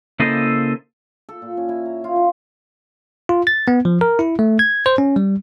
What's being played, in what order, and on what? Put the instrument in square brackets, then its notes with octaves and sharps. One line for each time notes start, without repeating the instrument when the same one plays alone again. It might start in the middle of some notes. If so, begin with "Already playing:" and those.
[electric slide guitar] C#3 A#3 E4 A4 C5 D#5
[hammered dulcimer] A4
A#2
C#4
E4
A#5
F4
F4
[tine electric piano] F4
A6
B3
F3
A#4
E4
A3
G#6
C5
C#4
G3